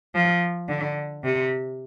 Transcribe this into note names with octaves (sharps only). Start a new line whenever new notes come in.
F3
D3
C3